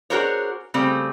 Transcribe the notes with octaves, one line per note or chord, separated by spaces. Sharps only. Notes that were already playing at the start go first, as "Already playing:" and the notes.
D4 F#4 G#4 A#4 C5 C#5
C#3 G3 A3 C4